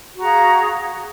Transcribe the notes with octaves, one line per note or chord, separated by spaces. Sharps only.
F#4 G#4 F5 A#5